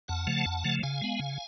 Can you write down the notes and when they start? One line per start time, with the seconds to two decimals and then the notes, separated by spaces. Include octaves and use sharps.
0.08 F2 F#5 A5
0.27 C#3 F3 A3
0.45 F2
0.64 C#3 F3 A3
0.83 C#3 F5 G#5
1.01 G#3 B3
1.19 C#3